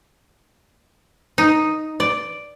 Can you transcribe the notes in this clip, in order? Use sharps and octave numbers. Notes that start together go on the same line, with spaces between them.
D#4
D5